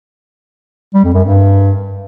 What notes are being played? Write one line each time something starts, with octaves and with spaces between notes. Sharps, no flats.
G3
F2
F#2
G2